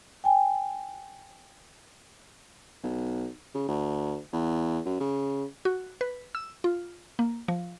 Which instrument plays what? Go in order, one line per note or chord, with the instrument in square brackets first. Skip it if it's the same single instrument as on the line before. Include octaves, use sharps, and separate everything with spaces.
[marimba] G5 G#5
[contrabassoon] B1
C#3
D2
E2
F#2
C#3
[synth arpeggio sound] F#4
B4
E6
F4
A#3
F3